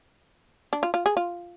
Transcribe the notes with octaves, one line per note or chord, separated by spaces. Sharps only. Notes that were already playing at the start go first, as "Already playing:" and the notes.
D4
F4
F4
G#4
F4